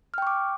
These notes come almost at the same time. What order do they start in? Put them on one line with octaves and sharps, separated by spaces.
F6 G5 C#6 D6